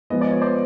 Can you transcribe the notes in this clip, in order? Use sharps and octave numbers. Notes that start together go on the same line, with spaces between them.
F3 G#3 B3 D#5
D5
C#5
C5 D5